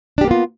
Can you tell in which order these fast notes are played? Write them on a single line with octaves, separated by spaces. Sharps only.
D4 G4 A#3 B3 F4